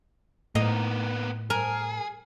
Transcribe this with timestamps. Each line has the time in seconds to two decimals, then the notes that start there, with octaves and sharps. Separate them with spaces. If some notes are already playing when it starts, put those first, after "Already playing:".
0.55 A2 A#3 B3 D#4
1.50 G#4 A#4